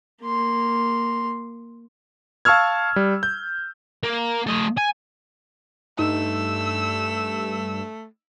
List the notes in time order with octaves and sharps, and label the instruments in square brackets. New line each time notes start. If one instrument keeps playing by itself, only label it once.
[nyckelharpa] A#3 C6
[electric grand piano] F5 A5 C#6 E6 F6 G#6
G3
G6
[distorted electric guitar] A#3
A3 D#5
G#5
[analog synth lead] G2 [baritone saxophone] A3 [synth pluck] D#4 [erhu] E6